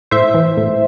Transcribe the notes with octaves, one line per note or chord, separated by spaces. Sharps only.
A2 C5 E5
E3
A2